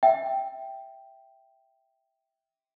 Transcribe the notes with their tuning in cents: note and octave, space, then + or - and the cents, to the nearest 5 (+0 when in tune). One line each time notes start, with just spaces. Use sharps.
E5 +0 G5 +0